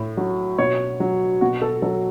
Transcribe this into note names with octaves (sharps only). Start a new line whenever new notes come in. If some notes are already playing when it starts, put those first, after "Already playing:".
Already playing: A2
F#3
B2 C#5
F#3
B2 F#4
A4
F#3 A4